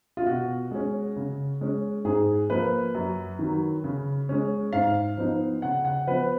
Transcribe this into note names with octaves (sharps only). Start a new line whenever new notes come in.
F4
B2 F#4
G#3 C#4
C#3
G#3 C#4
G#2 G#4
F3 A#3 B4
F#2
D#3 F#3
C#3
G#3 C#4
G#2 F5
F3 B3 D#4
C#3 F#5
F#5
F3 B3 B4